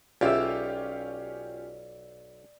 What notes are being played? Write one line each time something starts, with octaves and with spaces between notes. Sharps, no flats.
B1 C#4 F4 G4 G#4 D5 E5 E6